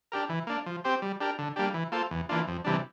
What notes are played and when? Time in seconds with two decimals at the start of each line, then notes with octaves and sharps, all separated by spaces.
0.12 D4 G4 A#4
0.29 E3
0.47 A#3 D4
0.66 F3
0.84 C4 G4 C5
1.02 G3
1.21 D4 G4 A#4
1.39 D3
1.56 G3 A#3 D4 G4
1.74 E3
1.92 A#3 F4 A4 C5
2.11 E2
2.29 E3 A#3 D4 F4
2.47 F2
2.64 C3 E3 G3 D4